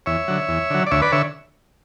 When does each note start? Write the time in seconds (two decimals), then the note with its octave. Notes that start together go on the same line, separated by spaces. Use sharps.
0.06 E2 C#5 E5
0.28 D3 F#3
0.49 E2
0.70 D3 F#3
0.87 D5
0.91 D2 C#5 E5
1.02 B4 D5
1.12 D3 C#5 E5